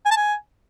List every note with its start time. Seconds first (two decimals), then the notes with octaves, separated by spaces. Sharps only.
0.06 G#5
0.11 A5
0.17 G#5